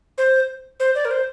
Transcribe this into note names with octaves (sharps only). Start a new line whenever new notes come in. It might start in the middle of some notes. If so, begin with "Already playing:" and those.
C5
C5
D5
A#4
C5